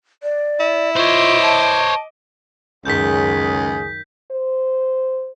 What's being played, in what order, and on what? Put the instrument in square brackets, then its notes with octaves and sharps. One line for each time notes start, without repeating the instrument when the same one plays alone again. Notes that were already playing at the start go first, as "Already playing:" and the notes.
[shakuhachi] D5
[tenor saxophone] E4
[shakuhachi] F4 [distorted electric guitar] C5 C#5 [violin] D#5 D6
[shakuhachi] A5
[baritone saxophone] C#2 [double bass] F#2 D#3 [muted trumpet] G#4 [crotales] G6 B6
[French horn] C5